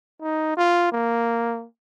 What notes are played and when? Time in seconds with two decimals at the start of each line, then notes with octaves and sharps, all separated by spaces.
0.22 D#4
0.57 F4
0.92 A#3